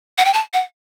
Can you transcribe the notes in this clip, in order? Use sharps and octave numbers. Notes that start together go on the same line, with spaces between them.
F#5
G5
A5
F#5